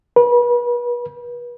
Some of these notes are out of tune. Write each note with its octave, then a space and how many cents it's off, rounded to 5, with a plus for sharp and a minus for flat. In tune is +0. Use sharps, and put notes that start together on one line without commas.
B4 -35